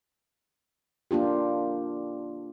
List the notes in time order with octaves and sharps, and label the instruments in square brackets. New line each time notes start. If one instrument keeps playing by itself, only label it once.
[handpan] A#3 D4 F4 G4